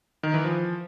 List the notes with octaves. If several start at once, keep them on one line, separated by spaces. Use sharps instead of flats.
D#3
E3
F3